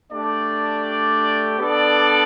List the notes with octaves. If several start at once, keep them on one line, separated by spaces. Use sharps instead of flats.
A3 D4 G4 D5
B3 D4 A4 D5